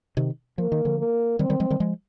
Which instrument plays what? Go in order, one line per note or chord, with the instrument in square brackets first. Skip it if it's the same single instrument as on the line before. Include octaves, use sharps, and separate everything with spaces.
[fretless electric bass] C3 D#3
[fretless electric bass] F3 [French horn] A#3
[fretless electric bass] D#3
D3 F3
[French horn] A#3
[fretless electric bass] D#3 G3 [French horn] C4
[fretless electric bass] D#3 G3
F3 G#3
D#3 G3
F3 G#3